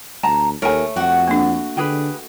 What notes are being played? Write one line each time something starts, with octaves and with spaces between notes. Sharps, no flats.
D2 A5 A#5
D#2 A3 A4 A#4 C#5 G#5
F2 F#4 G4 F#5
A#3 D4
D3 G4 G#4 B4